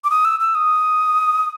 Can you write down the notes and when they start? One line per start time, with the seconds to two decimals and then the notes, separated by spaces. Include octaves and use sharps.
0.04 D6
0.10 D#6
0.25 E6
0.40 E6
0.55 D#6